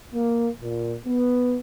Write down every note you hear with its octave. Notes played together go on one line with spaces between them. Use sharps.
A#3
A#2
B3